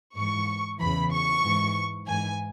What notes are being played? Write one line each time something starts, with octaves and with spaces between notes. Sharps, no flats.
G#2 E3 C#6
E2 C#3 E3 B5
C#6
G#2 E3
G#2 E3 G#5